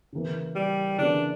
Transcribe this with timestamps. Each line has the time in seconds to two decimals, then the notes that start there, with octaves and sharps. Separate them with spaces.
0.13 C#3 E3 A#3
0.55 G3
0.98 C#3 E3 A#3 D4